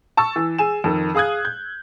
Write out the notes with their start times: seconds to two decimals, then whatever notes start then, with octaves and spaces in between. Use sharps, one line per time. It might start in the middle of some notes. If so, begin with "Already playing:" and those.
0.17 A5 C#6 E6 A6
0.36 E3
0.58 G#4 G#5 E7
0.84 F2 D#3
1.15 G#4 F5 D#6 F#6 G#6
1.45 G6